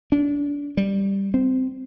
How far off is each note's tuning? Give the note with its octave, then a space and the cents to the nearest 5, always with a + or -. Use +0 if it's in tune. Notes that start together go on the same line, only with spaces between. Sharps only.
D4 -30
G3 +5
C4 -15